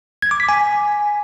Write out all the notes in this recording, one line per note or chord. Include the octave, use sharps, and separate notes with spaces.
G#6
D6
B6
G#5